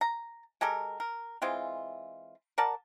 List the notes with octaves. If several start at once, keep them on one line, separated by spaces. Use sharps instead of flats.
A#5
G#3 G4 A4 A#4
A#4
E3 G#3 C4 F4
A#4 D5 F#5 A5